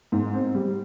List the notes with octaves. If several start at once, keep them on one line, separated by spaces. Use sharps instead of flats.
G#2
C4
G3